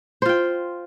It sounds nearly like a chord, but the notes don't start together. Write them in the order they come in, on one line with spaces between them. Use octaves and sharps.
C5 F4 G5